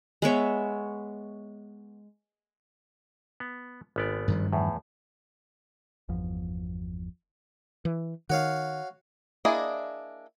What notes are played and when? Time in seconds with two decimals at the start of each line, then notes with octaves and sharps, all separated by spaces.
0.22 G#3 B3 C#5 E5
3.40 B3
3.96 G#1 B3 D5
4.28 G2 D#3 F3
4.53 E2 A2
6.09 G1 E2 F3
7.85 E3
8.30 D#3 F#4 C#5 F5
9.45 A#3 D4 E4 G#4 D#5